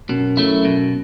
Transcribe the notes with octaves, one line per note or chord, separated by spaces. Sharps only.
F#2 B2
F#3 A3 E4
B2